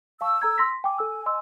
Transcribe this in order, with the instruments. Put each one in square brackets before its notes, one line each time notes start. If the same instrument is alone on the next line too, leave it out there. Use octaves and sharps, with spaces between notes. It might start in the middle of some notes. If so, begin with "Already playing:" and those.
[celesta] F5 A5 C#6 [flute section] E6
[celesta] A4 A#5 G#6
C6 A#6 B6
[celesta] G5 D6 [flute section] G#5
[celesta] A4 E6
D#5 C6 E6